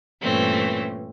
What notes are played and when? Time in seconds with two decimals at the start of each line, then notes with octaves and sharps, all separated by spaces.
0.23 G2 A#2 E3 A3 C4 C#4